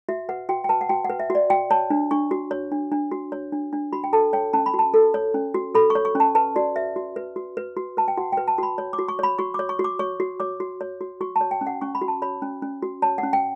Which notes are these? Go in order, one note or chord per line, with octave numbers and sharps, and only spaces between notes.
F#4 E5
B4 F#5
F#4 G5
G5
B4 A5
F#5
F#4 G5
F#5
B4
E5
F#4 D5
F#4 G5
C#5 A5
D4
D4 C#6
F#4
C#5
D4
D4
F#4
C#5
D4
D4
F#4 B5
G5
A4 A5
C#5 G5
C#4 A5
B5
F#4
A5
A4
C#5
C#4
F#4
A4 B5
C#6
C#5
C#6
C#4 A5
B4 A5
F#4 D5
B4 E5
F#4
B4
F#4
B4
F#4
B4 A5
G5
F#4 F#5
B4 G5
A5
F#4 B5
C#5
D6
F#4
C#6
C#5 B5
F#4 C#6
C#5 D6
C#6
F#4
D6
C#5 C#6
F#4
C#5 D6
F#4
C#5
F#4
F#4 C#6
A5
C#5
G5
C#4
F#5
C#4 C#6
B5
F#4
A5
C#5 B5
C#4
C#4
F#4
C#5 A5
F#5
C#4
G5